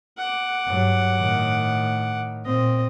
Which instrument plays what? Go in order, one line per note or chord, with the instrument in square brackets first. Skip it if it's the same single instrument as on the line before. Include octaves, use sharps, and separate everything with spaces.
[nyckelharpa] F#5 D6
[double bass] G2 F#3
A2 D#3
[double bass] A#2 C4 [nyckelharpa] D#5